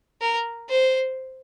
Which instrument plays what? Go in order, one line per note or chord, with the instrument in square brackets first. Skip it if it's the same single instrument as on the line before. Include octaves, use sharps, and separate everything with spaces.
[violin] A#4
C5